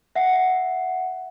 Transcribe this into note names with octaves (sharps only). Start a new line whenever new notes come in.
E5 F#5 C7